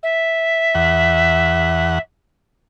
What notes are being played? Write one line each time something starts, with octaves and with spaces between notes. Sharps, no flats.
E5
E2 F#5